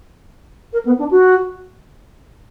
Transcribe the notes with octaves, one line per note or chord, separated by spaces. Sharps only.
A#4
B3
D4
F#4